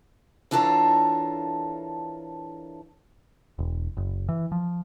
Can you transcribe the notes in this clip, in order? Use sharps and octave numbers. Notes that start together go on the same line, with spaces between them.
E3 D4 F4 A4 A#4 C#5
E1
F#1
E3
F3